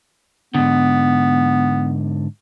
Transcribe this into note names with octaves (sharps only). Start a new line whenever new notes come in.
G#2 D3 B3